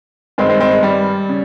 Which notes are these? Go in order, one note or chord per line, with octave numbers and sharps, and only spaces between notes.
G2 D#3 G#3 C4
G#3 C4
G#3 C4
G#3
G3
C#3